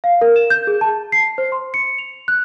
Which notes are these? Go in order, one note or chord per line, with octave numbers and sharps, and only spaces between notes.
F5
A#4
E7
G6
G#4
A5
C7
C5
C6
C#7
F7
F#6